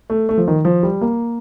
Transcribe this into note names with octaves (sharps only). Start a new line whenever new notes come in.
A3
A3
F3
D#3
F3
G3
A#3